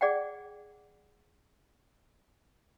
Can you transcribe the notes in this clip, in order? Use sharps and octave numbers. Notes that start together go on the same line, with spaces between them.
G#4 D5 F#5 G5